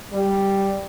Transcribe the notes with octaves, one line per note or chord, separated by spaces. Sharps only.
G3